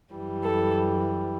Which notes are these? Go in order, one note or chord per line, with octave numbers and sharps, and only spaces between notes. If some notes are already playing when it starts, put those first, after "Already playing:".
F#2 E3 G3
A4